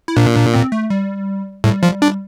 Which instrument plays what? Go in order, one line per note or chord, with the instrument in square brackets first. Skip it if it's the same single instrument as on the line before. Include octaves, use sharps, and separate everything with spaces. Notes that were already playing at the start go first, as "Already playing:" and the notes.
[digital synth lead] E4
[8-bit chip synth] A#2 [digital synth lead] D4
[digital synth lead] D4
C4
A3
G3
[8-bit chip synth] A2 [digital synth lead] G3
[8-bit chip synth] F3
D4